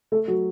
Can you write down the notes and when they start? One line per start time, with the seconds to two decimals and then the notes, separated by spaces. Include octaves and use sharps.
0.12 A3 A4
0.28 F#3 F#4